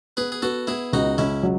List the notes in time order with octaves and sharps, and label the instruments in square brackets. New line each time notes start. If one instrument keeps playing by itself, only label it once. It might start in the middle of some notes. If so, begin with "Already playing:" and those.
[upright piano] B3 [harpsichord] G#4 B4
[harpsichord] G#4
[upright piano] B3 [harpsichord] F#4 A4
[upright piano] B3 [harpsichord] E4 G#4
[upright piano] C#2 [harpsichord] D#4 F#4
[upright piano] C#2 [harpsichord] C#4 E4
[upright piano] F#3